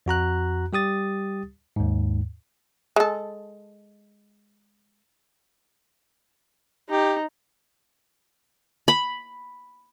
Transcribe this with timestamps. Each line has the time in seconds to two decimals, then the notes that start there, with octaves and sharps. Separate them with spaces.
0.06 F2 F#4 A#5 F#6
0.73 G3 G4 D#6 A6
1.76 D#2 G#2
2.96 G#3 A4
6.90 D#4 G4
8.88 B5